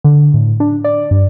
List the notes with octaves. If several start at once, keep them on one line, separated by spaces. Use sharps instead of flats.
D3
A2
D4
D5
G2